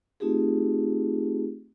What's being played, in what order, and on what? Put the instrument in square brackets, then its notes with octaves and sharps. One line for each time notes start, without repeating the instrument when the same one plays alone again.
[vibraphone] A3 C4 D#4 F4 G4 G#4